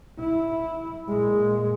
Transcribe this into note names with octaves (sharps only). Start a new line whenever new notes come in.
E4
A#2 G#3